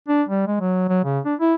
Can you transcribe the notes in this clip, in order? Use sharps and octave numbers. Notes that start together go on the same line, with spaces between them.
D4
G3
G#3
F#3
F#3
C#3
D4
E4